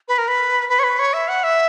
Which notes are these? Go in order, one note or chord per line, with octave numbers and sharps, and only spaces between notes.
B4
A#4
B4
B4
C#5
B4
C#5
E5
F#5
E5